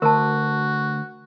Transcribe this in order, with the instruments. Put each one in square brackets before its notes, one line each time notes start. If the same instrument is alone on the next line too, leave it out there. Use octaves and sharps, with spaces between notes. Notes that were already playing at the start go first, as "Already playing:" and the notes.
[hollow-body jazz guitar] D2 [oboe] F#4 [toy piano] A#4 A5